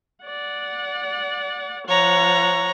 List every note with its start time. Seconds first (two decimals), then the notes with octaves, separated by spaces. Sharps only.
0.25 D5 F#5
1.88 F3 C#5 F#5 A#5